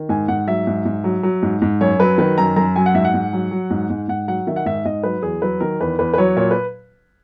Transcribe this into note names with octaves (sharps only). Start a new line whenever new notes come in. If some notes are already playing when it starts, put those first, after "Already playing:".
Already playing: D#3
G#2 G#5
G#2 F#5
F#3 E5
G#2
G#2
F#3
F#3
G#2
G#2
F#2 C#5
F#3 B4
D#3 B4
F#2 A#5
F#2 A#5
F#3 G#5
F#5
G#2 E5
F#5
G#2
F#3
F#3
G#2
G#2
G#2 F#5
F#3 F#5
D#3 E5
F#5
G#2 E5
G#2 D#5
F#3 B4
E2 G#4
F#3 B4
D#3 A#4
E2 B4
E2 B4
B4
F#3 C#5
A#2 C#5
B4